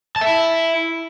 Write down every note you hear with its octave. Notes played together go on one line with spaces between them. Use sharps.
A5
E5
E4